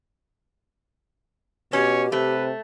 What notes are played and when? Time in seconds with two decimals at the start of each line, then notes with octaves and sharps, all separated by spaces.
1.73 B2 C#4 G4 C#5
2.12 C3 A3 B4